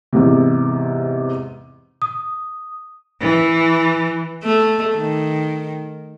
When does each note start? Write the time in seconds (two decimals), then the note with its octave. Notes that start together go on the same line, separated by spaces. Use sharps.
0.13 E2 G#2 C3
2.02 D#6
3.21 E3
4.44 A3
4.95 D#3